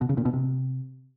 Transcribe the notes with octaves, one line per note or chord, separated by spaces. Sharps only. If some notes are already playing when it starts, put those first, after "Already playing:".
B2
C#3
A#2
B2
C3